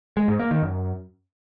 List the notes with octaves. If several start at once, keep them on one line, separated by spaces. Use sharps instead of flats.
G#3
G#2
A#3
D#3
F#2